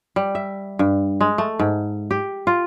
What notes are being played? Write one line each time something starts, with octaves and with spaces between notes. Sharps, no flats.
G3
E5
G2
G#3
A3
G#2
G4
F4